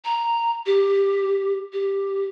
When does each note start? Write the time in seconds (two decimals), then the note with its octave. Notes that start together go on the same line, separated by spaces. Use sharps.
0.05 A#5
0.66 G4
1.73 G4